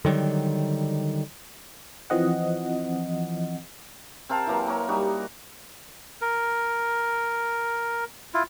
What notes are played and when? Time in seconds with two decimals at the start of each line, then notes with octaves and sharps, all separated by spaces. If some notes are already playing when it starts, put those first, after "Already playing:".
0.05 D3 D#3 F#3 G3
2.10 E3 F3 C4 D#5 F#5
4.29 C4 A#4 F5 A5
4.47 E3 F#3 A#3
4.67 A#3 C#5
4.88 G3 D#4 F#4
6.21 A#4
8.34 E4 F4